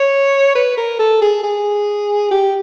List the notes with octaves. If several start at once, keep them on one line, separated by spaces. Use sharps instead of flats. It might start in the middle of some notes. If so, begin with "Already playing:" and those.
Already playing: C#5
B4
A#4
A4
G#4
G#4
G4